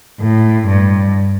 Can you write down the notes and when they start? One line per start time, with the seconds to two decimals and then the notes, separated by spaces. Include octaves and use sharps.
0.20 A2
0.67 G2